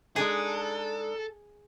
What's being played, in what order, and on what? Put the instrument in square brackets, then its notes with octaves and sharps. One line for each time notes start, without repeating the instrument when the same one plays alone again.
[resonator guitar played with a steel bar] G#3 D4 D#4 [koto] G#4 [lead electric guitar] A4